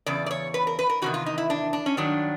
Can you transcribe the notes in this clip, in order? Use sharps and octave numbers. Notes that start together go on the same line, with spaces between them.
E2 C#3 D5
D5
C#5
B4
A#4
B4
A#4
E2 C3 D#3 F#4
F4
D#4
E4
D4
D4
C#4
G2 D#3 F#3 D4